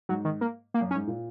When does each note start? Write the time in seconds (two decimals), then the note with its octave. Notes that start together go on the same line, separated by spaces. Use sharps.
0.09 G#2 F#3
0.25 D#3
0.41 A#3
0.74 A#3
0.81 F#2
0.91 C#4
0.95 G#2
1.07 A#2